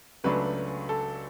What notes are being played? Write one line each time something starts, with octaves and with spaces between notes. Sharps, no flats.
C#2 C#3 F#3 A3 D4 B4
A4